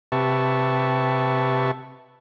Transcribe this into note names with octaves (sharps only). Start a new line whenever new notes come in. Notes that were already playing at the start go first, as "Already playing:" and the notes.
C3 G4 B4 E5 A5 C#6